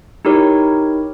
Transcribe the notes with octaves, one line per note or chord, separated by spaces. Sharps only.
D#4 E4 G4 A#4 C#5